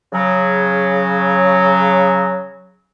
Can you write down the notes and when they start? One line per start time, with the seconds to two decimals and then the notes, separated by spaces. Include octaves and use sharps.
0.12 C#3 F#3